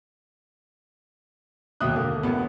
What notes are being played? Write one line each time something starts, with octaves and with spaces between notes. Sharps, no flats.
E1 D#2 B2 E5 D#6 F#6
D3 A#3
A1 B3